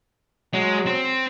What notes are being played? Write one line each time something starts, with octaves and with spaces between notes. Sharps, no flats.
F#3 G#3
C4